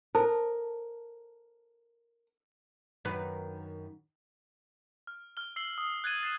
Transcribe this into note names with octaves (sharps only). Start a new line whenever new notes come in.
A4 A#4 C5 A5
F#2 D#3 B4
F6
F6 G7
E6 C7 F#7 G7
D#6
F#6 G#6 A6 D#7 F#7
A6 C7 E7